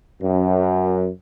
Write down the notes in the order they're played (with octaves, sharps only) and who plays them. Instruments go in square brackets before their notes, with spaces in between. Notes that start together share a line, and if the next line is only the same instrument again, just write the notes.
[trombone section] F#2